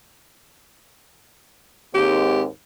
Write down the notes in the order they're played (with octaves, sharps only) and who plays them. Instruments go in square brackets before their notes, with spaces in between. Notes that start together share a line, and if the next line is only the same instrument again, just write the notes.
[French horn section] D#2 G#2 C4 [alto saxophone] G4